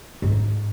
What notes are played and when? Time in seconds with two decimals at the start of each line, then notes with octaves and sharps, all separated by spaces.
0.22 G#2